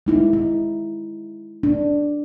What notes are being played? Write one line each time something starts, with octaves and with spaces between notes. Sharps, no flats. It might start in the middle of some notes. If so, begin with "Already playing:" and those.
G#3 D#4 E4
E4
D4